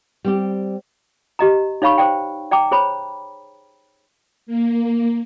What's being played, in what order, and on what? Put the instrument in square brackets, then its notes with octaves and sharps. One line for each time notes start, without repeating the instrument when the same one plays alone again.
[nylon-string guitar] G3 C4 G4
[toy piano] G4 D#5 A#5
D#4 C#5 F5 B5 C#6
C5 D5 G5
D5 G5 A#5 D6
G#4 C5 C#5 B5
[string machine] A#3